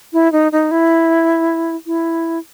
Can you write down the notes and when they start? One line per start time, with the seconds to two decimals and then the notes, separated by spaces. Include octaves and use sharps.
0.13 E4
0.32 D#4
0.52 D#4
0.71 E4
1.86 E4